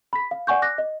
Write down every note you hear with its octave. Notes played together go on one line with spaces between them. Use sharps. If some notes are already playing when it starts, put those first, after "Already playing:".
B5 B6
F5
D5 F#5 G#5 C#6 G6
D6 F#6 A#6
D#5